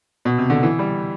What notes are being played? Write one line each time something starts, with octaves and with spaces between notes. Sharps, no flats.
B2
C3
D3
E3
G3